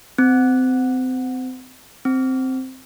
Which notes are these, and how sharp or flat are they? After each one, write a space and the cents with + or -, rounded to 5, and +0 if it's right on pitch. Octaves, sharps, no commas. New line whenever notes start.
C4 -30
C4 +0